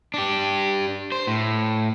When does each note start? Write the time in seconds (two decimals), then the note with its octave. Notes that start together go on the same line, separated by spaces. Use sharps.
0.14 D4 G4
1.12 C5
1.27 A2